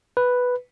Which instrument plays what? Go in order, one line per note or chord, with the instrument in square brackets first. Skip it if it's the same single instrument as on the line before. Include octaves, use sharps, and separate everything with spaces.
[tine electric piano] B4